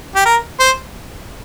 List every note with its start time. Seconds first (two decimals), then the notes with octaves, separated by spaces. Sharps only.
0.15 G4
0.25 A#4
0.60 C5